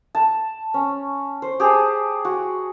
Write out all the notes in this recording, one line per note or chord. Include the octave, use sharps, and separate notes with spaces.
A5
C#4
C5
G4 G#4 C5 A5
F#4